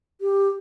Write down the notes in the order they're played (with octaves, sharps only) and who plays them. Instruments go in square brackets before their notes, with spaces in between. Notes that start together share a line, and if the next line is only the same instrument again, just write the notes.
[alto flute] G4